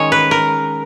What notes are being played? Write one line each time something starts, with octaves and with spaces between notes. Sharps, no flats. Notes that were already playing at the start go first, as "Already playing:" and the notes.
Already playing: D#3 G#3 C#4 C#5 D#5
B4
A#4